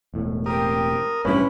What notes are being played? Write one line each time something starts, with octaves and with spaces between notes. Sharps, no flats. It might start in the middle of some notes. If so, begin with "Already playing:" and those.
E1 A2
C4 G4 A#4 D#6
A1 G2 C3 E3 C#4 E4 B4